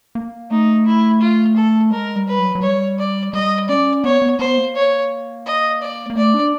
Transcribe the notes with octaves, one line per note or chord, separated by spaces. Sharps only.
A#3
A3 D#4
E4
F4
A4
G#3 A#4
G3
B4
F#3
F#3
G3 C#5
D5
G3 D#5
C#4 D5
B3 C#5
B3
B3 C5
A#3
C#5
D#5
D5
A#3
A3 D5
D4